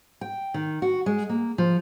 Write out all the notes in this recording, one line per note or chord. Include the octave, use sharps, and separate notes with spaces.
G5
D#3
F#4
G#3
A#3
F3